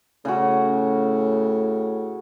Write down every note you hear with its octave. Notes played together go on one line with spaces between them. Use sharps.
A2 C#3 F#4